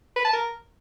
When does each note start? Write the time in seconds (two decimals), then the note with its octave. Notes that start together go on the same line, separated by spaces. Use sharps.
0.16 B4
0.24 A5
0.33 A#4